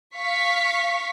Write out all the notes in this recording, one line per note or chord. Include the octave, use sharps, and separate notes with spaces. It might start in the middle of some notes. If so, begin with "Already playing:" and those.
F5 C#6 B6